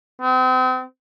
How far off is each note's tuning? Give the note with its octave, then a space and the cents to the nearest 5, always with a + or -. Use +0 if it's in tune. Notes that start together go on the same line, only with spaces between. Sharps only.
C4 -40